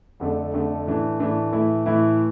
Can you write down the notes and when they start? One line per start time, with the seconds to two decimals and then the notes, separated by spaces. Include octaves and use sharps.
0.20 F2 D3 A3 D4
0.54 F2 D3 A3 D4
0.86 A2 E3 A3 D4
1.19 A2 E3 A3 D4
1.53 A2 E3 A3 E4
1.86 A2 E3 A3 E4